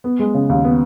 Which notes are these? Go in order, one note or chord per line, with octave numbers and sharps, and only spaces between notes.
B3
G#3
C#3
D#2
B3